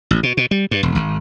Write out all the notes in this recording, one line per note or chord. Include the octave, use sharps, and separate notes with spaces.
A1
B2
B2
G3
G2
E1
G#1